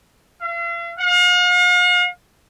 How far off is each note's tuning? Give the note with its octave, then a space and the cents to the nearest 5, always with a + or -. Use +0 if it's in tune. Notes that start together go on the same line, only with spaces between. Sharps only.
F5 -45
F5 +45